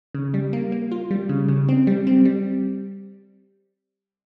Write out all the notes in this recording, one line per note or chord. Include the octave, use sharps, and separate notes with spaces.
C#3
G3
A#3
A#3
F4
G3
C#3
C#3
C4
G3
C4
G3